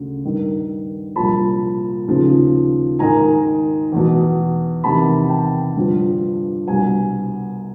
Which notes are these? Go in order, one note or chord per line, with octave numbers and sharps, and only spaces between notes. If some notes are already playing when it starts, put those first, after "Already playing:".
Already playing: D2 C#3
G2 D#3
C2 A#2 F3 A5 B5
D#2 C#3 F3
G#2 D#3 G#5 A#5
E2 B2
E2 C3 D#3 A5 B5
G5 A5
G2 D3 F3
C2 B2 F#5 G#5